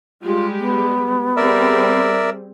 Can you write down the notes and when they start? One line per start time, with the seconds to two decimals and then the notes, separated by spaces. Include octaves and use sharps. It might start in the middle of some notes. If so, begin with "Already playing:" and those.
0.22 G3 G#3 F4 G4
0.59 B3
1.36 G3 C4 G#4 A#4 D5 E5